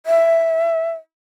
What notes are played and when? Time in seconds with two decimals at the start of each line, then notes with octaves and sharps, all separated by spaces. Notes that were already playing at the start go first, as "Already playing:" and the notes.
0.06 E5